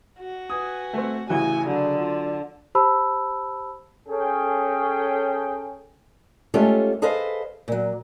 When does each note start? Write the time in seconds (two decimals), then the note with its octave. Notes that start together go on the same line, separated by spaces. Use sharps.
0.20 F#4
0.50 B4 G#5 D#6
0.94 A3 C4
1.29 A1 C#3 E3 F#4 G#5
1.67 D3 F#3
1.98 F4
2.75 G4 C5 A5 B5 E6
4.09 C#4 G#4 A4 G5
6.54 G#3 A3 C#4 F4 G4 A4
7.02 G#4 A4 B4 C5 D#5 F5
7.68 A#2 F#3